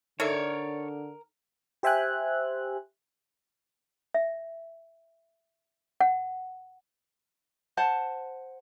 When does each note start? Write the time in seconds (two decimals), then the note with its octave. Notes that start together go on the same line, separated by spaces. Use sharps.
0.20 D3 D#4 A4 A#4 C#5 D5 E5
1.83 G4 C5 E5 G5 G#5 F#6
4.14 E5
6.00 F#5
7.77 C5 F#5 A5